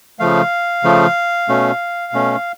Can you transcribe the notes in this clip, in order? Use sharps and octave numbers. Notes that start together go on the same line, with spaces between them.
C#3 F3 A3 F5
C#3 F3 A3
B2 A3 C#4
B2 A3 C#4